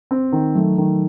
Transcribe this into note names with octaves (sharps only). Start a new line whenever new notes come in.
C4
D#3
F#3 A3
D#3